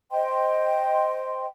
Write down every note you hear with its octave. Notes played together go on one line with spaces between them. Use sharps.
C5 D#5 G5 C6